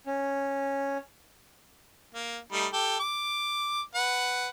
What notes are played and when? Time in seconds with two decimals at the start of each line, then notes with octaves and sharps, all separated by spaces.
0.06 C#4
2.14 A#3
2.52 G3 A3 D#4
2.73 G4 A4
3.00 D6
3.95 B4 F#5